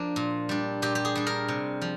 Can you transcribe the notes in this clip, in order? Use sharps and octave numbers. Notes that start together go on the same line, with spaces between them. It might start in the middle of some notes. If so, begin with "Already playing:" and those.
Already playing: F3 A#3 D4
A#2
G3 D4
A#2 G4
G4
G#4
G3 D4
A#4
C3
F3